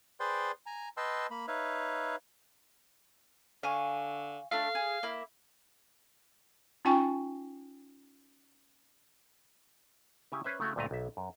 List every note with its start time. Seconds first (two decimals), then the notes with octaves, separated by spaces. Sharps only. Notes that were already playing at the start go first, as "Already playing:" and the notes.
0.20 G#4 B4 C5 D5 G5 C6
0.66 G#5 A#5
0.97 B4 D#5 G5 A5 C6 E6
1.31 A#3 B5
1.48 D#4 B4 C#5 E5 F5
3.63 D3 F5 G#5 C#6
4.52 A3 D4 F5
4.75 G#4
5.03 A#3 E4
6.85 C#4 D#4 F4 G5 G#5 C#6
10.32 C#3 E4 G4 G#5
10.44 C#4 B4 C5 E5
10.60 C#3 A3 E4 F#4
10.76 D2 G2 A#2 A3 D#5 A#5
10.91 B1 E5
11.17 F#2